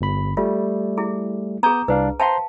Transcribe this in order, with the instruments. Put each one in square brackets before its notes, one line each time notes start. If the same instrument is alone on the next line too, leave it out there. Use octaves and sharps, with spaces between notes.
[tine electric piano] G1 B5
[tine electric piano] G3 A3 [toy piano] F4
[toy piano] E4 G#4
[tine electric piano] B3 D#6 G6 [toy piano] G#4 A#5
[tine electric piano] C2 D4 F5 [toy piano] B4
[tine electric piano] C5 A#5 C6 [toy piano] F5 G5 A5